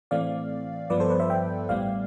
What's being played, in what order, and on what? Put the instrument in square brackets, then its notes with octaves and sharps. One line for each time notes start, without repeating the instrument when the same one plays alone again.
[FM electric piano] A2 E3 A3 C4 D5 F5
G2 F3 B3 B4 D5
A4 C5
B4 D5
C5 E5
E5 G5
A1 A2 G3 B3 D5 F5